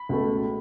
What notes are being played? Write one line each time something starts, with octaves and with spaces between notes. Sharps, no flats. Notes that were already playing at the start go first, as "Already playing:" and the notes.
Already playing: B5
C#2 B2 A3